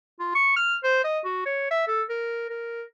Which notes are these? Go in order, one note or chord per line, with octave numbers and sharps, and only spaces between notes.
F4
C#6
F6
C5
D#5
F#4
C#5
E5
A4
A#4
A#4